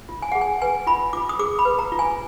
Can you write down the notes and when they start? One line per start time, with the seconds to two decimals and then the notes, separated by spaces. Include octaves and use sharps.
0.09 F4
0.22 G#5
0.32 G#4 F#5
0.41 G#5
0.62 B4 G#5
0.87 F4 B5
1.13 F4 D6
1.29 D#6
1.39 G#4 D6
1.59 B5
1.65 B4
1.79 A#5
1.92 F4
1.99 G#5